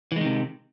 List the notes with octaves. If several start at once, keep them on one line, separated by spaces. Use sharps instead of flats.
C3 D#3 E3 G#3